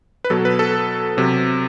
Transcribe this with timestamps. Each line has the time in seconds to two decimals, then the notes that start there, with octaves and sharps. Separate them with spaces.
0.24 B4
0.30 B2 F#3 A4
0.45 B4
0.59 A4
1.17 C3 F#3